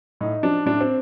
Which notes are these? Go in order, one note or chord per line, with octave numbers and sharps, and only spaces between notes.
A2 D#4
F3 D4
A2 D4
C4